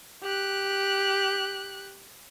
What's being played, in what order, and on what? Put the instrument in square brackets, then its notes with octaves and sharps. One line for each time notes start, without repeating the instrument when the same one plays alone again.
[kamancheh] G4 F#6